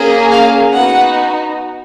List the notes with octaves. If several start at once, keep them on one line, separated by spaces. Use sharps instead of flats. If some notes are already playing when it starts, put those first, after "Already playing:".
Already playing: A#3 C#4 G#4
F5
B3 D#4 F#4 F#5